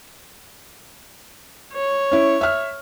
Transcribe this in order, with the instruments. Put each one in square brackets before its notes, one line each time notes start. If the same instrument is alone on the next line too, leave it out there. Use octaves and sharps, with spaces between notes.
[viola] C#5
[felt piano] C#4 E4
E5 F6